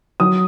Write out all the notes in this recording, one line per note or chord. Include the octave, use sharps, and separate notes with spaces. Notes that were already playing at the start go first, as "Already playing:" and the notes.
F#3 D#6